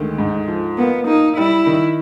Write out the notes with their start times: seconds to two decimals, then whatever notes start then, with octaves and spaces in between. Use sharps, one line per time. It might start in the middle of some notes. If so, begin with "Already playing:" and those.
Already playing: D2 D#3 G#3
0.18 G#2
0.48 F3
0.78 A#3 B3
1.07 A#3 D#4
1.37 G3 E4
1.66 D#3